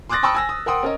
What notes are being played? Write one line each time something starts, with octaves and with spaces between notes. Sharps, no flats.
C6 D6 D#6 F#6 A6 A#6
G5 A5 B5 C#6 D#6 E6
G#5 E6 A#6
D#6
A#4 F#5 G5 C6 D#6
C#4 A#4 D#5